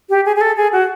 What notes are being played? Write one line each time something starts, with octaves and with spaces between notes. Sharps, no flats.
G4
G#4
G#4
A4
G#4
F#4